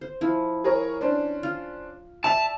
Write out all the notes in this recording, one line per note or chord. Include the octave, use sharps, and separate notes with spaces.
C5
F3 E4
G#4 A#4 C#5
C#4 D4 C5
F4
D5 E5 A5 F7